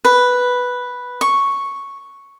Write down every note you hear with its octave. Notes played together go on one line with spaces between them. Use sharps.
B4
C#6